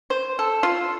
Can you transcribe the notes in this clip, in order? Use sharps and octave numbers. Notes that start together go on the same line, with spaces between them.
C5
A4
F4